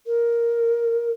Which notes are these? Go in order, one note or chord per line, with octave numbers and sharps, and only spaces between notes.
A#4